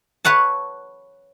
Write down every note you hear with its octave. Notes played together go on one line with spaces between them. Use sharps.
B4 C#5 F#5 A5